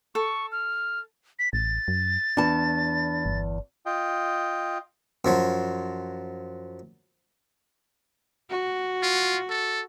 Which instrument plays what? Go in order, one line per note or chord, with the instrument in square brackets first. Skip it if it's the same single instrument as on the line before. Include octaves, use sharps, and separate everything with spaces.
[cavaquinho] A4 [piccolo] C#6
[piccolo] F6
B6
[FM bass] A1 [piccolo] A6
[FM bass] F#2
[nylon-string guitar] E2 A5 [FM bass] D4
[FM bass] G1
[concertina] F4 D#5 G5
[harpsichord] F#2 F3 F#3
[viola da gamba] F#4
[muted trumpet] F4
A4